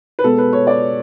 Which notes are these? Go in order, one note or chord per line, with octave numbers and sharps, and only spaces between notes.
B4
B2 G#3 B3 A4
B4
C#5
D5